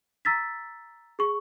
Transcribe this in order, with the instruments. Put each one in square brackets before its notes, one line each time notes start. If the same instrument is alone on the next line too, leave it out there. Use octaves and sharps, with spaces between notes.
[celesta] A#5 E6 A6 B6
G#4 C#6